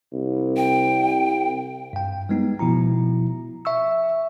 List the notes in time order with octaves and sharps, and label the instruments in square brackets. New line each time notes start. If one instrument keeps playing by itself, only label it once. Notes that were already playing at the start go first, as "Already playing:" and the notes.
[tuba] C2
[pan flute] G5
[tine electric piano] G2 G5
G3 G#3 B3 D#4
B2 F3 E4 A#5
E5 C#6 E6